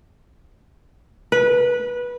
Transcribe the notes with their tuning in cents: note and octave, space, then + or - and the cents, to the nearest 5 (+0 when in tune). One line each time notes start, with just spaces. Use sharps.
B4 -20